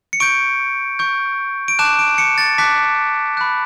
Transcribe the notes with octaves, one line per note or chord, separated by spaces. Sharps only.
C#7
C#6 G6 D7
C#6 G6
D7
A5 D6 F#6 E7
D7
C#7
A6
A5 D6 F#6 B6
B5 F#6